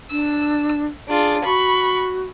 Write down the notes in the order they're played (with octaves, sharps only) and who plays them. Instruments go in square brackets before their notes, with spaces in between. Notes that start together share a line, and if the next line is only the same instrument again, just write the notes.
[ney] D4 [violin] E6
[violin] D4 F4 [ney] G#4
[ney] F#4 [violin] B5 C#6